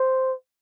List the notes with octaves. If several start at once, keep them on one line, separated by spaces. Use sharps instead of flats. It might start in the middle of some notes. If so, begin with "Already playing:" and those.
Already playing: C5